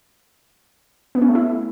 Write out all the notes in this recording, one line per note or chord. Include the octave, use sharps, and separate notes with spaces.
B3
C#4
A3
E4